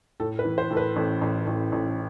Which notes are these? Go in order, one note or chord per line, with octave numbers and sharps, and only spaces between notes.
A2 A4
B4
E3
C5
A2 A4
B4
A1 A4
A1
A1
A1